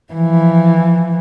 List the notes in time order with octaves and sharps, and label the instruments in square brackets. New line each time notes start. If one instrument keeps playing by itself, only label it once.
[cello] E3 F3